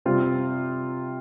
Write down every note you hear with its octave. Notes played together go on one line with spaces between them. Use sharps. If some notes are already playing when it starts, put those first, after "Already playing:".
C3 G3 C4 F4